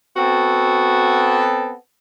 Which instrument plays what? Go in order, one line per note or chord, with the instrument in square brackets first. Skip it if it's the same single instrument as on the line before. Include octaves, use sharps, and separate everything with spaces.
[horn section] B3 C4 A4 [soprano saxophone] F#4